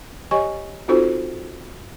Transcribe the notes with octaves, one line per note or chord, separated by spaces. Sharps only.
G4 C#5 D#5 G#5 C#6
C4 D#4 F4 F#4 A4 C5